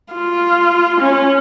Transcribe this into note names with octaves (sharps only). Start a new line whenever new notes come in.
F4
C#4